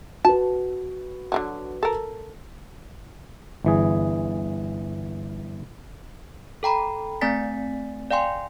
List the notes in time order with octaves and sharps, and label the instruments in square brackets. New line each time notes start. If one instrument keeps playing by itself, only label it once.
[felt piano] F#4 B4 [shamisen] A5
[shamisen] D3 E3 F#3
A4 A#4
[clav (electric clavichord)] G1 E3 G#4
[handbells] A4 G5 A#5 B5
A3 C4 D5 G#5 A6 B6
D5 F5 G5 G#5 C6